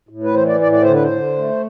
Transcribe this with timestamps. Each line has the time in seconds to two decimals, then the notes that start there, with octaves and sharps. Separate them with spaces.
0.09 A2
0.24 B4
0.34 E3 C5
0.47 D5
0.60 A2 D5
0.72 D5
0.82 D3 C5
0.93 B4
1.02 C5
1.11 D3
1.36 A3